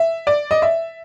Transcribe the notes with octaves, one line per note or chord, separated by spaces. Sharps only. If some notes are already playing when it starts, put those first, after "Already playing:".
Already playing: E5
D5
D#5
E5